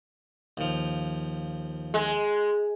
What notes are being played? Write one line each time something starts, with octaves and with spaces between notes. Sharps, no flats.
D#2 F3
G#3